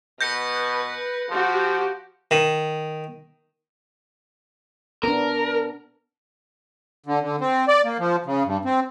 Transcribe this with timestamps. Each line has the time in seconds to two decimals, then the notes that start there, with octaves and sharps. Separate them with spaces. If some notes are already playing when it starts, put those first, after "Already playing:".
0.21 B2 B4 G6 A#6 C#7
1.30 F3 F#4 G4
2.31 D#3
5.03 B3 D4 A#4
7.06 D3
7.22 D3
7.41 C4
7.68 D5
7.85 A#3
7.99 F3
8.26 C#3
8.45 G2
8.65 C4